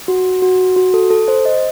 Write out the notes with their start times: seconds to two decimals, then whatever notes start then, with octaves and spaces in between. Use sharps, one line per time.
0.08 F#4
0.42 F#4
0.76 F#4
0.94 A4
1.11 A4
1.28 C5
1.46 D#5